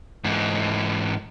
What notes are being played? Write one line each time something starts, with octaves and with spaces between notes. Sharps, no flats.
G#2 E3